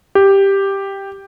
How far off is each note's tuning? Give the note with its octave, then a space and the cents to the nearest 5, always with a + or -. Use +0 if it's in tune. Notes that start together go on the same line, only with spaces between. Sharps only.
G4 +5